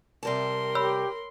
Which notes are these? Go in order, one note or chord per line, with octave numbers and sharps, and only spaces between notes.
C3 G3 A#4 A5 C6
G4 C#5 B5 E6